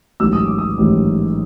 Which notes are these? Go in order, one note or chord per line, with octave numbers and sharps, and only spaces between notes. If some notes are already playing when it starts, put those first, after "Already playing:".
A1 G#2 D#3 F#3 E6
D#6
D6
D#6
A1 G#2 D#3 F#3